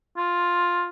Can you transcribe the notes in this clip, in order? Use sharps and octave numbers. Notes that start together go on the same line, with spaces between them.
F4